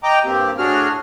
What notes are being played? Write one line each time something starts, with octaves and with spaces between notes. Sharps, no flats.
D#5 G5 A#5 D6
G2 A#3 C4 G4
A2 D4 F#4 G#4 F6